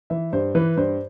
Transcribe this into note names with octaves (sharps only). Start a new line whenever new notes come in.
E3 E5
G2 C5
E3 B4
G2 C5